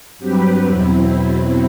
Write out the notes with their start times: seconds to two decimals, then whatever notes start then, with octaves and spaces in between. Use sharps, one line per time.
0.18 G2 F#3 C4 G4 B4
0.65 E2 B2 F#3 C4 E4